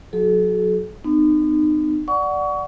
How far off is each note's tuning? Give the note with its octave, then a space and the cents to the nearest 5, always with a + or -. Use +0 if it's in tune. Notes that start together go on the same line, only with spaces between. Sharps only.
F#3 -20 F#4 +5 A4 -40
B3 +40 D#4 -35
D5 +0 F#5 +0 C#6 +30